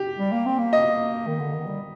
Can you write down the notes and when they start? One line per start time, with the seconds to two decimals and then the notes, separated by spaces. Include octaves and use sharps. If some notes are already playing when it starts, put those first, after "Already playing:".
Already playing: G4
0.19 G3
0.32 A#3
0.46 C4
0.59 A#3
0.73 D#5
1.27 D#3
1.39 D3
1.54 D#3
1.67 G3